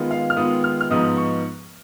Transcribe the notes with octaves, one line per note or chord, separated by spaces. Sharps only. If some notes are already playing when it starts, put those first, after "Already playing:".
Already playing: D#3 G#3 B3 F4
F5
F6
D#3 G#3 B3 F4 D#6
F6
F6
G#2 F3 B3 D#4 D#6
C#6